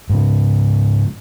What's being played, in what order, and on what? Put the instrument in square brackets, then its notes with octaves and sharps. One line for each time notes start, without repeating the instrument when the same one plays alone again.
[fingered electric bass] G#2 C#3